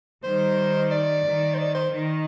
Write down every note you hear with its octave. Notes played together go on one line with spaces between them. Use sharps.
D#3 G3 C5
D5
D#3
C5
D5
C5
D#3